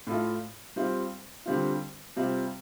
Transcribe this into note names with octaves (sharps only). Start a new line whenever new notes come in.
A2 A3 F4
G3 C4 F4
D3 G3 C4 F4
C3 G3 C4 F4